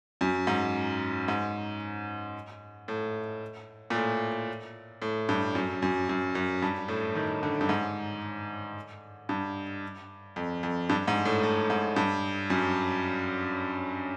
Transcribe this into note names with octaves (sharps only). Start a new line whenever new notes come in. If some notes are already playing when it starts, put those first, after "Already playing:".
F#2
G#2
G#2
A2
A#2
A2
A2
G2
F#2
F#2
F#2
F#2
G2
A2
D#3
D3
G2
G#2
G2
F2
F2
G2
G#2
A2
A2
G#2
G2
F#2